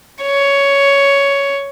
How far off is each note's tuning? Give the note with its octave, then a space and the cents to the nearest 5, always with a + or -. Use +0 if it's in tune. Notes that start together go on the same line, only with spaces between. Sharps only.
C#5 +10